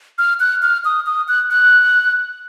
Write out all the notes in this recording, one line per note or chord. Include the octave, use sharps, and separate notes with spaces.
F6
F#6
F6
D#6
D#6
F#6
F#6